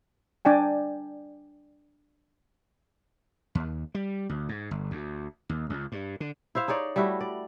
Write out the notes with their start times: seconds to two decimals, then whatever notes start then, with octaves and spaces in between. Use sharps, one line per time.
0.45 D4 D5 G5 G#5
3.55 D#2
3.95 G3
4.29 D2
4.49 G#2
4.71 G1
4.91 D2
5.49 D#2
5.70 C#2
5.92 G2
6.20 D3
6.55 E4 C5 E5 F5
6.68 D#4 G#4 C#5 D5
6.96 G3 A3 E4 F#4
7.21 D5